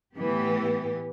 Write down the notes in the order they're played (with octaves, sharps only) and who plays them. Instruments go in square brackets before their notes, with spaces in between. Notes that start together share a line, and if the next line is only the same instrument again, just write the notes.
[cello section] A2 E3 B3 G4